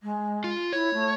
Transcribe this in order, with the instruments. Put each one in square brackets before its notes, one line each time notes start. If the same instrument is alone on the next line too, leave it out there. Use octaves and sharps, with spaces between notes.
[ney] G#3
[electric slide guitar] F4
[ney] E4 [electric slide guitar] C#5
[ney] A3